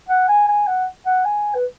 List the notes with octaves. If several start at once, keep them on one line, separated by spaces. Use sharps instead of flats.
F#5
G#5
G#5
F#5
F#5
G#5
B4